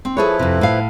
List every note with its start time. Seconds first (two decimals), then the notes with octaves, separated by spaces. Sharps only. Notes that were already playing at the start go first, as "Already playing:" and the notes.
0.05 C4
0.17 F3 E4 G#4 A4 B4 C#5
0.39 F2 C3
0.61 A2 F5